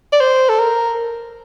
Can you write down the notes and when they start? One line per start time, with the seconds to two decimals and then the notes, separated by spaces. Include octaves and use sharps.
0.12 D5
0.20 C5
0.49 A4
0.59 A#4